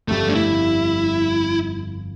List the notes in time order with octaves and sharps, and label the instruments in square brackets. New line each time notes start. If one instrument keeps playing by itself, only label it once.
[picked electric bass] G1 F2 C3 G3 [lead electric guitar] A3
[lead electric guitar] D4
E4